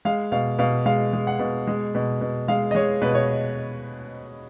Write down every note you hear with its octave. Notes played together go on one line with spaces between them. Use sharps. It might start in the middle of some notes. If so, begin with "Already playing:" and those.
G#3 F5
B2 F5
B2 F5
G#3 F5
G#3
F#5
B2
G#3
B2
B2
G#3 F5
D#5
G#3 C#5
B2 B4
C#5